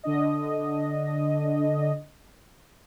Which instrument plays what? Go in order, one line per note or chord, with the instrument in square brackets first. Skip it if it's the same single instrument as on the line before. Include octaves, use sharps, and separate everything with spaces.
[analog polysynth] D3 D4 D#5